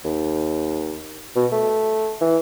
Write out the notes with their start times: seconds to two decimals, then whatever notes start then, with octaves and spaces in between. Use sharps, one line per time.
0.04 D#2
1.36 B2
1.52 A3
2.21 E3